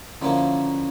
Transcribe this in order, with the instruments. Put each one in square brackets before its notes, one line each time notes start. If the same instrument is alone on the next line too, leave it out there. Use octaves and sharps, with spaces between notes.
[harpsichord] D3 F3 A#3 [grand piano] C#4 E4